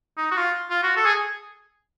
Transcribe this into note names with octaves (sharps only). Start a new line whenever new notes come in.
D#4
F#4
F4
F4
F#4
A4
G#4